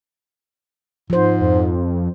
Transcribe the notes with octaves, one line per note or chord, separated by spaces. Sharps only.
G#2 F3 C5
F2